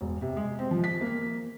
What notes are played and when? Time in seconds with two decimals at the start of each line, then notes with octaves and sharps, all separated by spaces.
0.01 E1
0.21 C3
0.37 G#3
0.59 C4
0.71 F3
0.84 B6
1.01 A#3